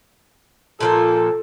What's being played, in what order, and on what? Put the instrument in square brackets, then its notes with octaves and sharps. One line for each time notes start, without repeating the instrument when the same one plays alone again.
[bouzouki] A#2 F3 A#3 [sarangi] A4